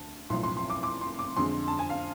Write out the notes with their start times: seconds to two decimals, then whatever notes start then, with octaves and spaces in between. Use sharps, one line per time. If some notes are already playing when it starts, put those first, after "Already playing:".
Already playing: D2 D3 A5
0.30 B1 A2 F3 C6
0.43 C6
0.57 C6
0.70 D6
0.83 D6
1.01 C6
1.19 D6
1.36 F2 D3 G#3 C6
1.68 A5
1.79 G#5
1.90 F5